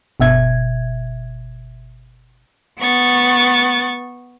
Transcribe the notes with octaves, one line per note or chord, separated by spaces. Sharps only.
G1 B2 E5 G#6
B3 C#6 A6